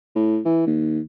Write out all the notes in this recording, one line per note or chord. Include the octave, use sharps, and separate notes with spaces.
A2
E3
D#2